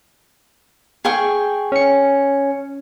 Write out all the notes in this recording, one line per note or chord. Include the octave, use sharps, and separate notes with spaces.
G#4 G5 C#6
C#4 C#7